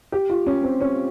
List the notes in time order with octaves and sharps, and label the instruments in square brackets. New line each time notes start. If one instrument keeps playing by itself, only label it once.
[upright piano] G4
F4
C#4
C4
C#4